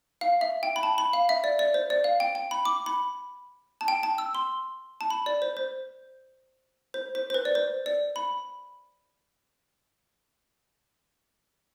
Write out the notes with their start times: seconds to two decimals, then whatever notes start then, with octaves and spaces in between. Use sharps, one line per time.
0.21 F5
0.41 E5
0.63 G5
0.76 B5
0.83 A5
0.98 B5
1.13 F5
1.29 E5
1.44 D5
1.59 D5
1.74 C5
1.90 D5
2.04 F5
2.20 G5
2.35 G5
2.51 B5
2.65 D6
2.86 B5
3.81 A5
3.88 G5
4.03 A5
4.18 E6
4.35 C6
5.01 A5
5.10 B5
5.26 D5
5.42 C5
5.57 C5
6.94 C5
7.15 C5
7.30 C5
7.34 B4
7.45 D5
7.55 C5
7.86 D5
8.16 B5